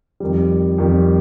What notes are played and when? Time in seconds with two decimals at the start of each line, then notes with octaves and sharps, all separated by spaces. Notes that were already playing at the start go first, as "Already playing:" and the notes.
0.20 F2 D#3 G3
0.78 F2 D#3 G3